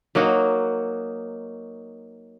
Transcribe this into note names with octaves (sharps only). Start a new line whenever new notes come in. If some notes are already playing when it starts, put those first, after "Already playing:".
F#3 A#3 D#4 F#4